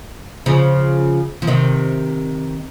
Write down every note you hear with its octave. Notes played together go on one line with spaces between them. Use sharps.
C#3 F3
F3
C3 D#3